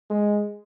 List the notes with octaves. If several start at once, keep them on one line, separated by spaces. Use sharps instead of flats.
G#3